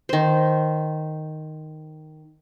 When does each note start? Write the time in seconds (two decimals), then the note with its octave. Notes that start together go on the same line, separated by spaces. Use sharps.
0.09 D#3 C5